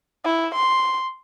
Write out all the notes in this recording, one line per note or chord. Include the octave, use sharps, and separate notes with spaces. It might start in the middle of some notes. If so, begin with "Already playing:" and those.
E4
C6